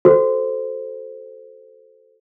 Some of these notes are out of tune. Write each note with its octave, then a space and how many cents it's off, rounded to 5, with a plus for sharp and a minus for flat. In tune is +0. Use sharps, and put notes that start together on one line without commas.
F#4 +20 A4 +0 C5 +0